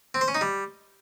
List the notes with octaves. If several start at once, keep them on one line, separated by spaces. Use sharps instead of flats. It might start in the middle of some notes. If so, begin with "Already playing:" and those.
C4
C5
C#4
D#4
G3